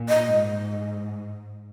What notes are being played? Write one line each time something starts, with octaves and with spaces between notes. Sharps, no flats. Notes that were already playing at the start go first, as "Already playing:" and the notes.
Already playing: A#2
D#5
G#2